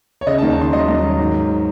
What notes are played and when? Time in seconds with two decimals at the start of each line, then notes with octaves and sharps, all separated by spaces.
0.21 C#5
0.27 C#3 D#5
0.38 A5
0.42 D#2
0.50 A5
0.57 D#2 C6
0.73 F#3 D#5
0.88 D#2
1.03 F#3
1.19 G#2
1.34 G#2